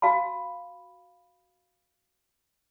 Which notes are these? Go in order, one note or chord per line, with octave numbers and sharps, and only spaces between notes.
F#4 F5 A5 B5